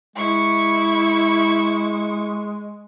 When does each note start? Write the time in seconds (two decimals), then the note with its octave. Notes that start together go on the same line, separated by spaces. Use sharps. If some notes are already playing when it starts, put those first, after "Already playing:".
0.16 G#3 E4 C#6